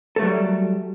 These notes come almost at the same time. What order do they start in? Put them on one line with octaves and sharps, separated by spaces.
A4 A3 F#3 G3